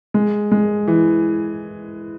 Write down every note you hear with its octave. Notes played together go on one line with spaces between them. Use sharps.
G#3
G#3
E3